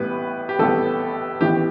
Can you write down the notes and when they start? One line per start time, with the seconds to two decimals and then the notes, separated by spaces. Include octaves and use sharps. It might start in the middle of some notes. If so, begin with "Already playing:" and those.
Already playing: A1 A2 G3 B3 B4
0.49 G4
0.59 A1 A2 G3 B3 A4
1.41 A1 A2 E3 B3 G4